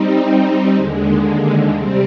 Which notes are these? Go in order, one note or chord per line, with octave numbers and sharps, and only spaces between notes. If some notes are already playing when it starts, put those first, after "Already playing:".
Already playing: G3 C4 D#4
D#2 D3 G#3
C3 G3 C4